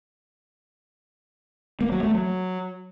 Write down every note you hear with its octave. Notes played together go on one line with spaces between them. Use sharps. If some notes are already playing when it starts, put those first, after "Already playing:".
A#3
F#3
A3
F#3